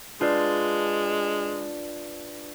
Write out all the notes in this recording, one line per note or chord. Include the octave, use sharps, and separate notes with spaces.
G#3 D4 F4 B4 D5